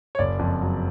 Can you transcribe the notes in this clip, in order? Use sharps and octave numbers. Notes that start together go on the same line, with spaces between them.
C#5
F#1 D5
F2
F#3